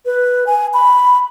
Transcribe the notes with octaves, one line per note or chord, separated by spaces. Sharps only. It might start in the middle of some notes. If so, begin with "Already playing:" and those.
B4
G#5
B5